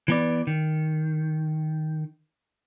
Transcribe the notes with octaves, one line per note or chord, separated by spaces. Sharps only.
E3 B3 D5
D#3